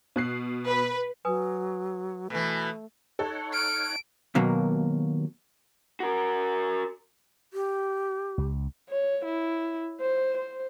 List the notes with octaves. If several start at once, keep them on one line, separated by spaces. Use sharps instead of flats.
B2 F#6 C7
B4
F#3 B4 G#5 D#6
B2 E3 A3
D#4 A4 C#5 F#5
F6 D7
D#2 B2 F#3 A#3
F#4 A#4
G4
C#2
C#5
E4
C5
C5